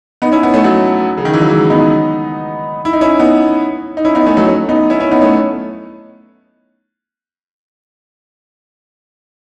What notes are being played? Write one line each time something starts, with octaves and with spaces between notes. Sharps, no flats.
B3 D#4
C#4 E4
B3 D#4
A3 C#4
F#3 A3
C#3
D#3
E3
F#3
E3 G#3
B3 D#4
E4
D#4
C#4 E4
B3 D#4
D#4
C#4 E4
B3 D#4
A3 C#4
F#3 A3
A3 C#4
B3 D#4
C#4 E4
C#4 E4
B3 D#4
A3 C#4